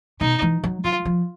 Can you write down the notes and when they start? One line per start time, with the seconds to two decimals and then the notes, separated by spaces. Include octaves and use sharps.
0.21 B2 D#4
0.42 E3
0.64 F#3
0.84 F#3 F4
1.05 F3